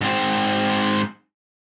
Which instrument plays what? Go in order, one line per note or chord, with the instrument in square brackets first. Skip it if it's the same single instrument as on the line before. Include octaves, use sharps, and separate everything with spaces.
[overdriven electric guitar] G#2 C4